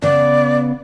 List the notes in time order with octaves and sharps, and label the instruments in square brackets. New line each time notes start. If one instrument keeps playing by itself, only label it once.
[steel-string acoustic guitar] C#3 B3 [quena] D5